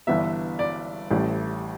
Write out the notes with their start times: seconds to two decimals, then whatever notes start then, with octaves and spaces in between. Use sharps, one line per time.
0.07 G1 G2 E3 B3 E5
0.59 D5
1.11 A1 A2 G3